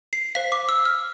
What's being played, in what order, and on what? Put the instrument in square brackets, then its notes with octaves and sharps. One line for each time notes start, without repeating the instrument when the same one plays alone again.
[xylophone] C7
C5 F5 B6
D6
E6
F6